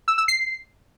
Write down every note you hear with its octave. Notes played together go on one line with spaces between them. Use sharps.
E6
E6
C7